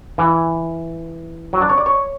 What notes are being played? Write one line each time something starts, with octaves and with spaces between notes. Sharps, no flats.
E3
F#3
D4
C#5
D5
C#5